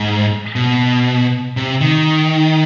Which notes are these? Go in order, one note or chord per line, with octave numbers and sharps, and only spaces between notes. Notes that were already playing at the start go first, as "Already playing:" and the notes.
Already playing: G#2
B2
C3
D#3